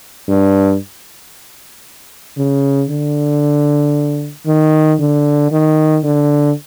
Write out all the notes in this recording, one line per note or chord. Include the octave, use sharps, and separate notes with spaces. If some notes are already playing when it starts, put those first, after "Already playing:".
G2
C#3
D3
D#3
D3
D#3
D3